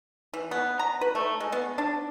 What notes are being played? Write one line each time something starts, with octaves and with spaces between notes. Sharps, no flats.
E3
B3
A#5
B4
A3
G#3
B3
D4